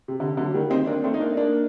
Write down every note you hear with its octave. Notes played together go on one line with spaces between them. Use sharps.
C3
D3
D3 F#3
D#3 G3
C4 D#4
A#3 D4
A3 C4
D#4
A#3 D4
A#3 D4